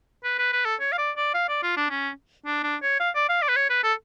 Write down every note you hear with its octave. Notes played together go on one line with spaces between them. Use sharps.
B4
B4
B4
A4
C#5
F5
D5
D5
F5
D5
F4
D4
C#4
D4
D4
C#5
F5
D5
F5
D5
B4
C#5
B4
A4